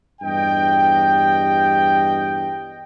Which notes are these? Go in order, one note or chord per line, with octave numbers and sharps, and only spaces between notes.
E2 G2 G4 D#5 G5